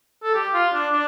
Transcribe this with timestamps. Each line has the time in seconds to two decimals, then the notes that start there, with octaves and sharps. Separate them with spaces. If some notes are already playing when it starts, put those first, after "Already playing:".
0.23 A4
0.35 G4
0.54 F4
0.74 D4
0.93 D4